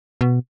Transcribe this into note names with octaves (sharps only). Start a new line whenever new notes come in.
B2